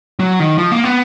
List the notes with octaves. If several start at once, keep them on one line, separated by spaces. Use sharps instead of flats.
F#3
D#3
F3
A#3
B3